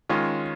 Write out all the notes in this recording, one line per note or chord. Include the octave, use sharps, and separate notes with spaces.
D#3 G#3 C#4 F4